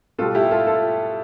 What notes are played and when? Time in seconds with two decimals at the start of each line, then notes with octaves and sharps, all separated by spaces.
0.19 B2 G3 F4 A4
0.35 E4 G4
0.51 F4 A4
0.67 F4 A4